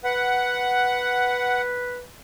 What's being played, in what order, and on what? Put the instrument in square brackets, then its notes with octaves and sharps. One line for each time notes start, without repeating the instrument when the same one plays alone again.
[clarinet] B4 [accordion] F#5